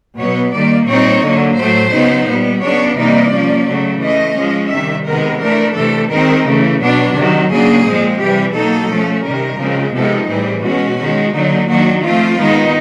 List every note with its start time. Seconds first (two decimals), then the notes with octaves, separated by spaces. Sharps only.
0.17 B2 F#3 B3 C#5
0.53 D#3 G3 A#3 D5
0.87 A#2 G3 C4 D#4 C#5
1.22 D3 F#3 A#3
1.58 A2 F#3 A3 C5
1.92 C#3 F#3 B3 D#4
2.27 A#2 G3 B3
2.62 C#3 F#3 B3 D4 C#5
2.97 C3 E3 G3 A#3 D#4 D5
3.32 F3 A#3 C#4
3.67 C#3 F#3 A3
4.02 E3 A3 C#4 D#5
4.36 F3 G#3 C#4
4.71 C3 D#3 G3 E5
5.06 C3 D#3 G#3 B3 A#4
5.40 E3 A3 D4 A#4
5.76 C3 E3 A3 A4
6.10 D#3 G#3 C4 D#4 A#4
6.46 C#3 E3 A3
6.81 B2 F#3 B3 D4
7.15 C3 D#3 F#3
7.50 C#3 F#3 A#3 D4 G#4
7.86 A#2 F3 G#3 C4
8.20 C3 E3 G3 G4
8.55 B2 F#3 A#3 D#4 A4
8.90 F3 A3 C#4
9.24 C3 D#3 G3 A#4
9.60 C#3 F3 G#3 C4
9.95 C3 F3 G#3 B3 D#4 A4
10.29 A2 E3 G3 C4 G#4
10.64 B2 G#3 C#4 F#4
10.99 D#3 G#3 C#4
11.34 D3 F#3 A#3 D#4
11.68 D#3 F#3 A#3 D4 F#4
12.03 F3 A3 C4 F4
12.38 D#3 G#3 B3 D#4